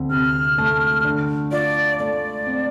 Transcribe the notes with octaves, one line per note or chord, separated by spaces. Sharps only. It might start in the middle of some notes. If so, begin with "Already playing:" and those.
Already playing: D2 C4
C3 F6
A3
D3
F4 D5
A3 D5
C4